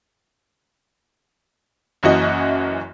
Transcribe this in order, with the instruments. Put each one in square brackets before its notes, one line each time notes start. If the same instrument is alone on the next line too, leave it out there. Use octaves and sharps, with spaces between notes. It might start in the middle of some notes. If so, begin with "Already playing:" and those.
[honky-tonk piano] F#1 F#2 E3 F#4 D#5